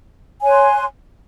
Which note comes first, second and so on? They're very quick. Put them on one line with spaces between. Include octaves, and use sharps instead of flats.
G#5 C#5 F#6 C6